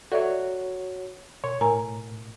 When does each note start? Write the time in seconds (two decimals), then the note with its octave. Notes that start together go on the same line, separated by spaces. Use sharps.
0.12 F#4 A4 C#5 D5 E5
1.44 B2 C#5
1.61 A2 A#4 G#5 A#5